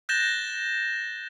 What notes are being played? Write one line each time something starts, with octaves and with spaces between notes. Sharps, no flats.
F#6 G6 A6 A#6 E7 G7